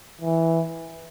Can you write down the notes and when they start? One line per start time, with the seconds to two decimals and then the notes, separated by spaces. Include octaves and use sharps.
0.22 E3